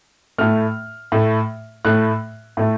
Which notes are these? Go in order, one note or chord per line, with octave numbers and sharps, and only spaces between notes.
A2 A3 F6
A2 A3
A2 A3 F#6
A2 A3